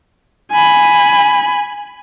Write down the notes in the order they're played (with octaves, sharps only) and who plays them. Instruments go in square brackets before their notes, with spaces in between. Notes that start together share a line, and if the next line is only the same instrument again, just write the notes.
[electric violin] G#5 B5